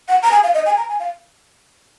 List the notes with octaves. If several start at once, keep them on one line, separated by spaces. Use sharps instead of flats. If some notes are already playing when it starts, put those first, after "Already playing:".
F#5
A#5
G#5
F5
D#5
G#5
A#5
G#5
F5